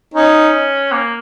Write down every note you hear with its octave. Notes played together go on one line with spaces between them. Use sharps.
C#4 D#4
A#3